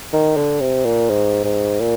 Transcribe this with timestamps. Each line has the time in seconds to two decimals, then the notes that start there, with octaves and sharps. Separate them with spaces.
0.13 D#3
0.37 D3
0.61 C3
0.85 A#2
1.10 G#2
1.44 G#2
1.80 A#2